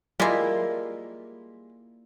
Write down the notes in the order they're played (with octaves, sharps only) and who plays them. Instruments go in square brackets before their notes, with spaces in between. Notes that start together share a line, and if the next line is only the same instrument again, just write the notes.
[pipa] G3 G#3 [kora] A#3 E4 F4